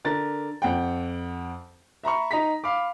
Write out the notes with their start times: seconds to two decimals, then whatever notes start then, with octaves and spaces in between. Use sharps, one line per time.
0.05 D3 A#4 A6
0.62 F2 F#5 G5
2.03 E5 A#5 B5 C#6
2.31 D#4 A#5 B6
2.64 F5 B5 D6